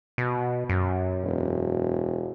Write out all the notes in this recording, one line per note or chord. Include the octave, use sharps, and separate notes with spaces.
B2
F#2
E1